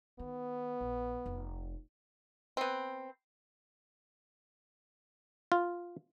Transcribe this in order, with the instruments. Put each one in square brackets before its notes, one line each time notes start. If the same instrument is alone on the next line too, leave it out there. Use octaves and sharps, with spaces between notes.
[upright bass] D#3 [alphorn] B3
[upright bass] A#1
F1
[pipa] B3 C4
[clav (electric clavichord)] F4